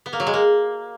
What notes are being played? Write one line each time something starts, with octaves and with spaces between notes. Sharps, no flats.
B3
A#3
F#3
G#3
A#3